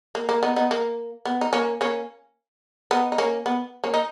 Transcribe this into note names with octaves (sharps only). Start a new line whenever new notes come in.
A#3
A#3
B3 D#4
B3 D#4
A#3
B3
D#4
A#3 C#4
A#3 C#4
B3 D#4
D#4
A#3 C#4
B3
A#3 C#4
D#4